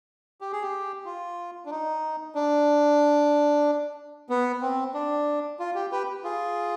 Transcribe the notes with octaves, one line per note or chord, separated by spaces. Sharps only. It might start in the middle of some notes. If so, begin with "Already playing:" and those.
G4
G#4
G4
F4
D4
D#4
D4
B3
C4
D4
F4
G4
G4 B4
F4 G#4